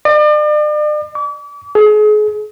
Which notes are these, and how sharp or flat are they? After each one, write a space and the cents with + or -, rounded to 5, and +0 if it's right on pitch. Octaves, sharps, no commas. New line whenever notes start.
D5 +40
D6 -40
G#4 +35